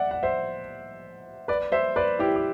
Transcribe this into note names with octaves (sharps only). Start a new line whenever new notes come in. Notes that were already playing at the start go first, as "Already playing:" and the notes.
Already playing: D5 E5 F#5
F#5
C5 E5
B4 D5
C5 E5
B4 D5
E4 G4
G4